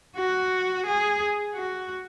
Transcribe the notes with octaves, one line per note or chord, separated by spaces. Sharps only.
F#4
G#4
F#4